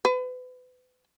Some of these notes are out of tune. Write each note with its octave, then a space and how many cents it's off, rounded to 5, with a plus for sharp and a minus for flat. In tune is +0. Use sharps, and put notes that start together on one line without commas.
B4 +35